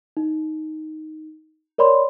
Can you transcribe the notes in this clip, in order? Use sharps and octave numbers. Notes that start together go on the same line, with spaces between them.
D#4
A#4 C#5 D5 B5 C6